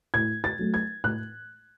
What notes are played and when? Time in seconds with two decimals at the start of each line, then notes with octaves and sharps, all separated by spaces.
0.14 A2 G#6
0.44 A6
0.59 F#3 A3
0.74 G#6
1.04 A2 F#6